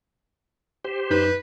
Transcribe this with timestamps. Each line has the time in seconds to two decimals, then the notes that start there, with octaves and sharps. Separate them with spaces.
0.84 G4 C5
1.10 F#2 D#4 B4 G6